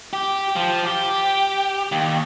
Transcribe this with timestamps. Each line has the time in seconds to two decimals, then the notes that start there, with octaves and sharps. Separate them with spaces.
0.13 G4
0.56 F3
0.86 G4
1.92 D#2